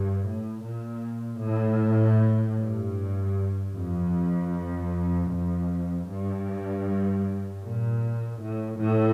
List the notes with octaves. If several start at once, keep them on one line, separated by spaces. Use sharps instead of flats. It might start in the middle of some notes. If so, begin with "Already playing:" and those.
Already playing: G2
A2
A#2
A2
G2
F2
F2
G2
A#2
A2
A2